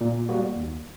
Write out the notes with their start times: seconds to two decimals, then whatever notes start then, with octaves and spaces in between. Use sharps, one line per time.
0.01 A#2
0.29 G3 A#3 F#4
0.56 D#2